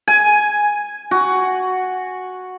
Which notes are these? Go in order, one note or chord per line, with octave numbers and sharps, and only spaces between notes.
G#5
F#4